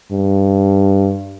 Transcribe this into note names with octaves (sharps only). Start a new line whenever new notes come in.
G2